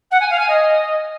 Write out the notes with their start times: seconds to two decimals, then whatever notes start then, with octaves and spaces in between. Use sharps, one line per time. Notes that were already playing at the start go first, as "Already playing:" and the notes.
0.11 F#5
0.20 G#5
0.30 F5
0.39 G#5
0.48 D#5